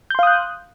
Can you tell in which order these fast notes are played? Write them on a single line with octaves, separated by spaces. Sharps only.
G6 C6 F5 D#6 F#6